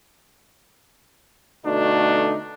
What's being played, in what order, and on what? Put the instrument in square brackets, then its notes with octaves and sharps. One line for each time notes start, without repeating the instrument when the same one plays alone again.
[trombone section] B2 D3 A3 D4 D#4 F#4